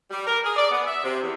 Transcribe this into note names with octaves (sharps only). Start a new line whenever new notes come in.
G3
A#4
G#4
D5
B3
E5
C3
E2